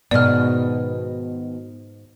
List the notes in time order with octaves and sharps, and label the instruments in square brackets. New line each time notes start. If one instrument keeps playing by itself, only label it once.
[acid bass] G#2 [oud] B2 D#3 [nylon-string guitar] G#3 B3 [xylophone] D5 F6